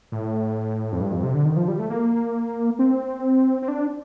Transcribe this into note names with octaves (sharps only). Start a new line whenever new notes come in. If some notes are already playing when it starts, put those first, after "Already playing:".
A2
F2
G2
F2
C3
D3
D#3
F3
G3
A3
A#3
C4
C4
D4